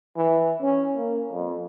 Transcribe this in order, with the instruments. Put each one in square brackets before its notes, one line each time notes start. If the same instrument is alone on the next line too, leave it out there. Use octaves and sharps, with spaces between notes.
[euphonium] E3
C#4
A#3
F2